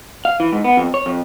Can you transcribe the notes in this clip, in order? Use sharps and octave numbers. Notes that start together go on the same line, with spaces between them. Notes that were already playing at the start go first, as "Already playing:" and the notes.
F5
E3
G#2
B3
F2
C#5
F2